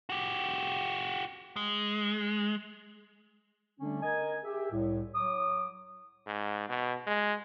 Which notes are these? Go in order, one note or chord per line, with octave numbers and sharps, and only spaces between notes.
F#4 G4
G#3
D3 G3 A3 C#4 D4
A#4 D#5 G#5
G4 G#4 E5
C2 A2
F#3 C#5 D6 D#6
G#2
B2
G#3